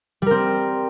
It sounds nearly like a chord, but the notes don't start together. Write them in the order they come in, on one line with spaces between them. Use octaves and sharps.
G3 A#4 C4